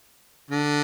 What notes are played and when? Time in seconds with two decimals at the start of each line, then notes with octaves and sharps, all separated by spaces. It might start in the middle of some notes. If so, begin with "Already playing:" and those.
0.51 D3